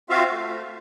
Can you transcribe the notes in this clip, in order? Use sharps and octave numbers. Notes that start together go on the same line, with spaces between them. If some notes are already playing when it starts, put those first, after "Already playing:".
C4 F4 F#4 E5 F5
A3